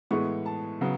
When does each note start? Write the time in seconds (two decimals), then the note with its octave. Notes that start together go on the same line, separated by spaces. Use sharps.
0.11 A2 E3 G#3 B3 C#6
0.46 A5
0.81 C#3 F#3 B3